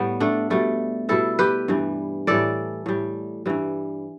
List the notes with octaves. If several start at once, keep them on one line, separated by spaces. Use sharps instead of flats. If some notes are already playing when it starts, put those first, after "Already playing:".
Already playing: A2 G3 B3
A3 D4
B2 G3 A3
B2 G3 E4 A4
G4 B4
G2 E3 G3
A2 E3 G3 A4 D5
A2 G3
G2 E3 G3